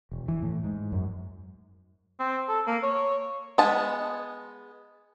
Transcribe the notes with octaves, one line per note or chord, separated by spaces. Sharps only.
E1
E3
A2
G#2
F#2
C4
A4
A#3
C#5
G#3 B3 A5